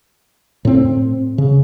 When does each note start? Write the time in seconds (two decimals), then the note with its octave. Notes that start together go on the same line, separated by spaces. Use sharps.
0.65 A2 C4
1.38 C#3